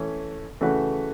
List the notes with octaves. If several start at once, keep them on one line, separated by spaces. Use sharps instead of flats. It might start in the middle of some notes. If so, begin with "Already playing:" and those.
Already playing: E3 A3 C#4
C#3 E3 A3 F#4 B4